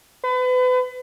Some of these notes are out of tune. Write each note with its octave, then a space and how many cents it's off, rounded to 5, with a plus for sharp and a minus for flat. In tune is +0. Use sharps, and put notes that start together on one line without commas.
B4 +35